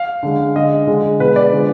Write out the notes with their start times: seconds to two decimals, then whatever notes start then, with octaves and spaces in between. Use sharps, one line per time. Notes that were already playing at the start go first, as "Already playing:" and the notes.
Already playing: F5
0.23 D3 G#3
0.56 D3 G#3 D#5
0.87 D3 G#3
1.20 B2 G#3 B4
1.36 D5
1.52 D3 F3 G#3 B4